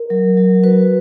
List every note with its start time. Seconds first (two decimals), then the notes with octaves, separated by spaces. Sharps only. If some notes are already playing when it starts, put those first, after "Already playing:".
Already playing: A#4
0.10 F#3
0.37 F#3
0.63 F#4 B4